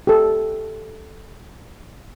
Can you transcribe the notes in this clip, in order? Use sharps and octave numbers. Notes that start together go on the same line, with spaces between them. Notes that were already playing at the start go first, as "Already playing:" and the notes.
G4 A4